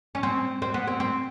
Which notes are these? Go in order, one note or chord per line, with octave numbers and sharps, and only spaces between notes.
C#4
C4
C4
B3
C4
C4